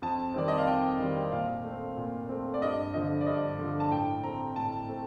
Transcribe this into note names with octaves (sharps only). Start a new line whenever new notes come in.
F2 A5
D#3 G3 C4 D5
D#5
F5
F2 G5
D#3 G3 C4
A#2 F5
A3
C4
A#2
A3 C4
D5
G2 D#5
D3 F3 D#5
D5
G2 D#5
D3 F3
A5
A2 G5
A3 C4 A#5
A2 A5
A3 C4